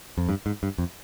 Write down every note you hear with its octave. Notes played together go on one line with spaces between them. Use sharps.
F2
G2
G#2
G2
F2